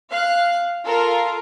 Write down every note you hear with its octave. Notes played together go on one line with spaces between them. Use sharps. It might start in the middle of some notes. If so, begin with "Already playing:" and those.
F5 F#6
F4 A4 A#4